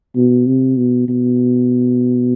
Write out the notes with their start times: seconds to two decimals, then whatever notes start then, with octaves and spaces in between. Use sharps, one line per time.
0.16 B2
0.47 C3
0.77 B2
1.08 B2